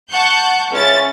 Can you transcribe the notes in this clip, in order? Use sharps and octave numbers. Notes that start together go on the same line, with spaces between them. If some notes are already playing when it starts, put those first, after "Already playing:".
F#5 A5 C#6 F#6 G6
C#2 C#4 E4 A6